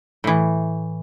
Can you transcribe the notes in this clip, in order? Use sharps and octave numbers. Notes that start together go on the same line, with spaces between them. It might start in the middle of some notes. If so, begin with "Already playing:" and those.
A2 E3